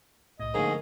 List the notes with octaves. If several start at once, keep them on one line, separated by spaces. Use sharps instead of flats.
C2 A2 D#5
G#2 D3 F3 A3 A#3 C#4 G#4 A#4